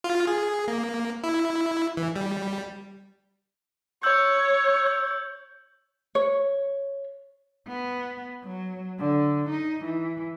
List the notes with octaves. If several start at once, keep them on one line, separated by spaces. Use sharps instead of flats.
F4
G#4
A#3
E4
E3
G3
C#5 E6 G6
E6
C#5
B3
F#3
D3
D#4
E3